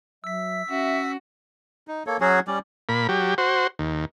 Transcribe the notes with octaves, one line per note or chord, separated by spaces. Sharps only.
F#3 E5 E6 B6
C#4 F#4 E5
D#4
A#3 A4 C#5
F#3 C#4 F#4 G#4
G3 C#4 D5
A#2 B5
F#3 G4
F#4 C5
D#2